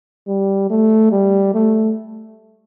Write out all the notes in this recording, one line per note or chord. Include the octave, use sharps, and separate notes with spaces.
G3
A3
G3
A3